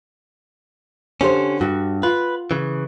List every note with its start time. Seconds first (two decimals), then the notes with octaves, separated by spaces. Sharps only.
1.21 D3 C#4 G4 C5
1.61 G2 F#4
2.03 F4 B4
2.51 C#3 E3